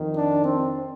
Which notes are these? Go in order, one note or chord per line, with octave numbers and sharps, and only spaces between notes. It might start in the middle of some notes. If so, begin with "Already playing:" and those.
Already playing: F2 D#3
D4
C4